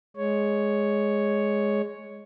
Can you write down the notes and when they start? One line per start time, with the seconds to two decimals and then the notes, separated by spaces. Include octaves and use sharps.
0.16 G#3 C#5